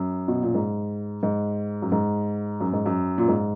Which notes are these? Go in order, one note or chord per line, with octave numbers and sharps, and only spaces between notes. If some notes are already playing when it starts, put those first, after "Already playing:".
Already playing: F#2
B2
A#2
G#2
G#2
F#2
G#2
F#2
G#2
F#2
A#2
G#2